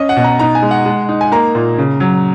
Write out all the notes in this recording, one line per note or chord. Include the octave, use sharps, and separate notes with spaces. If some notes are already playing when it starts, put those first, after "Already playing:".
Already playing: C#4 D#5
F#5
B2
A#5
D#4 A#5
G#5
G#3
F#5
G#3
D#4
G#5
A#3 A#5
A#2
C#3
F#3